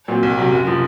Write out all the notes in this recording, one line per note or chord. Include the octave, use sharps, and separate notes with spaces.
A#2 F#3 C4
C2
C3 F#3
F#1
C3 F3